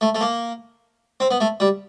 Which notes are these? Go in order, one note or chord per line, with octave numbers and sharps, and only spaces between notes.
A3
A3
A#3
C4
B3
A3
G3